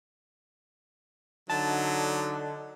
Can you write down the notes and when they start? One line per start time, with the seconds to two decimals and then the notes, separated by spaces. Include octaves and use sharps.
1.50 D3 F#3 D#4 A5